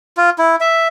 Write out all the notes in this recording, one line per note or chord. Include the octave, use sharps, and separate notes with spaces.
F4
E4
E5